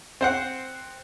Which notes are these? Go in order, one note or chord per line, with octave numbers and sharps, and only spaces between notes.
C4 C5 F#5